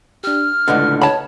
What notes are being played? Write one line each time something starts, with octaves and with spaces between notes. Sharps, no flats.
D4 G4 F6
C#2 A2 D3 B4 D#5 F#5
C#5 A5 B5